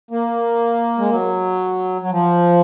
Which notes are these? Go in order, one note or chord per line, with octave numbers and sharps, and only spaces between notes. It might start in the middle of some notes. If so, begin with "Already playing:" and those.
A#3
G#3
F#3
F#3
F3